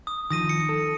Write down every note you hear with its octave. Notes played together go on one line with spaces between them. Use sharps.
D#6
D#3 F3 D#6 A#6 D#7
C#7
A4